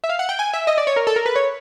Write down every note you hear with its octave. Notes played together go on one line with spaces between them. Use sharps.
E5
F5
F#5
G5
G#5
E5
D#5
D5
C#5
A#4
A4
A#4
B4
C#5